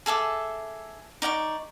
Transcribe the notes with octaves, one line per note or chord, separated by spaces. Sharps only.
G#4 A4 E5 D6
D#4 D5 F#5 C#6